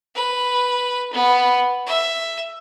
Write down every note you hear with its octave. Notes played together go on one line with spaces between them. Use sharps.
B4
B3
E5